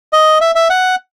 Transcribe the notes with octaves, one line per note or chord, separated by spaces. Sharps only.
D#5
E5
E5
F#5